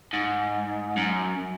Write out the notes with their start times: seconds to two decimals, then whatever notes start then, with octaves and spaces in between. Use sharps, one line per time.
0.13 G#2
0.97 F#2